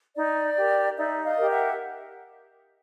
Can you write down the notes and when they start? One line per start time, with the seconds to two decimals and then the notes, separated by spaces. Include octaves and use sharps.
0.15 D#4 D5
0.56 G4 A#4
0.96 D#4 D5 E5
1.23 D#5 F5
1.37 G4 A#4
1.50 E5 F#5